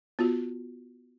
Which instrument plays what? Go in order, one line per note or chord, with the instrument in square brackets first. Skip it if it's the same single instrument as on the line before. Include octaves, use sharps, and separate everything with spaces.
[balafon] B3 F4 F#4